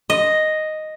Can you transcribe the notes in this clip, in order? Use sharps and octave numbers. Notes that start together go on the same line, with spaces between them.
D#5